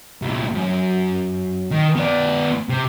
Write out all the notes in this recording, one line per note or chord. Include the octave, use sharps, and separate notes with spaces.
C2 A#2
F#2
D#3
B3 D5
C3